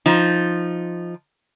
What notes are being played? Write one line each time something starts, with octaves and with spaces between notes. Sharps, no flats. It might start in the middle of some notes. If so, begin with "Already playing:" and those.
F3 D#4